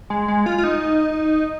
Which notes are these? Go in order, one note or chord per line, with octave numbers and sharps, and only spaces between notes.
G#3
G#3
F4
F4
D#4